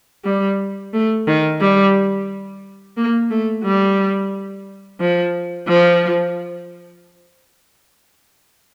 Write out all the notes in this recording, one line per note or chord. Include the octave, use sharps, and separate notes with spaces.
G3
A3
D#3
G3
A#3
A3
G3
F3
F3